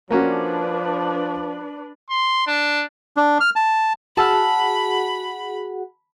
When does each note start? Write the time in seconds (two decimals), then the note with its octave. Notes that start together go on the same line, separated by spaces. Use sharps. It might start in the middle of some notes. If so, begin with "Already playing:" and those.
0.10 F3 A#3 C#4 D4 F#4 B4 D5
2.10 C6
2.47 D4
3.17 D4
3.40 F6
3.56 A5
4.17 F#4 G#4 F#5 A5 B5 E6 F6